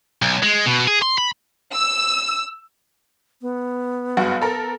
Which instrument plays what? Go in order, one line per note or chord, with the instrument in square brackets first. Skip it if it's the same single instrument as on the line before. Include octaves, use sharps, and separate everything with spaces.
[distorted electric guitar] B1
G#3
B2
G#4
C6
B5
[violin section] E6
[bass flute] B3
[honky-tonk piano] F#1 G2 F#4
A4 A#4